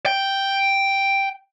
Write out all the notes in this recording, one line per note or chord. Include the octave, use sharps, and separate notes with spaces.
G5